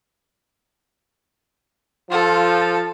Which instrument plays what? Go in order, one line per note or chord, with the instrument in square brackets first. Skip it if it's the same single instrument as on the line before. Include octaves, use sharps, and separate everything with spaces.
[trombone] F3 [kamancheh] F4 A4